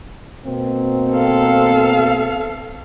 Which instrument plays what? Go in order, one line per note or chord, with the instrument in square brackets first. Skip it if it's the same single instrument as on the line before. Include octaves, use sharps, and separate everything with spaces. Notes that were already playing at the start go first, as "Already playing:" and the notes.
[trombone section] B2 A#3 C4
[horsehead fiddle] A4 F5